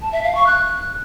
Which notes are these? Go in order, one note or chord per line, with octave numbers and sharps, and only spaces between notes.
A5
E5
F5
C#6
F#6